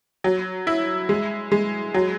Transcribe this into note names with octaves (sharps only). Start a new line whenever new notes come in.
F#3
E4
G#3
G#3
F#3